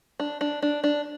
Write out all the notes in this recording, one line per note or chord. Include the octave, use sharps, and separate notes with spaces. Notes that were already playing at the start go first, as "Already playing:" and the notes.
D4
D4
D4
D4